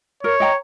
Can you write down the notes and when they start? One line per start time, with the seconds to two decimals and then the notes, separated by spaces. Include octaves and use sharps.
0.23 A#4 C#5
0.40 D#5 G5 A#5